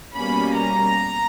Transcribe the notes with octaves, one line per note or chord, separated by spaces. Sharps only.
B2 G3 A#3 C#4 B5
A#5